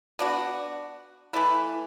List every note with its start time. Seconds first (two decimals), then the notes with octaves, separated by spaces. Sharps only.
0.19 B3 D4 F#4
1.33 E3 A3 E4 B4